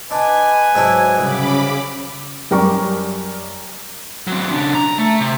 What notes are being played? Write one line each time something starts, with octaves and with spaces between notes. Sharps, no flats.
D4 B4 D#5 G#5
G#2 F#3 D4 E4
C2 C#3 B5 D6
F#2 G3 A#4 D5 C#6
F#3 C4
C#3 D4
A#5
A3
C3